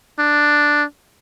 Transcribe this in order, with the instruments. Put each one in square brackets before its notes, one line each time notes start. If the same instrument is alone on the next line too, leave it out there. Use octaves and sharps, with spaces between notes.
[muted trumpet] D4